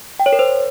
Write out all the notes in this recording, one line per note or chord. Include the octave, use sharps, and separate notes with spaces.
G5
C#5
A#4
C5